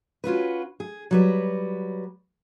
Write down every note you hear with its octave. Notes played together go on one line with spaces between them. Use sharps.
C#4 F4 F#4 B4
G#4
F#3 G3 B4